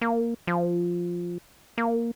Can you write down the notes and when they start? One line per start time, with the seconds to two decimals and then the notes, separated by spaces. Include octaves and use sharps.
0.01 A#3
0.47 F3
1.78 A#3